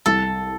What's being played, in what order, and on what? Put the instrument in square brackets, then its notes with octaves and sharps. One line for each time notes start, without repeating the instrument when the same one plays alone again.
[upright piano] C2 [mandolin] A4